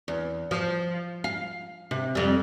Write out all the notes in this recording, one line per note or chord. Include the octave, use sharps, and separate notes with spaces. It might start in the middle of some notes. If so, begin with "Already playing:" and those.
E2
F3
F5
C3
F2 G3